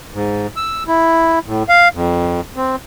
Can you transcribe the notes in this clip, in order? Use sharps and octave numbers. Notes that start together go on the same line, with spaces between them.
G#2
E6
E4
A2
F5
F2
C4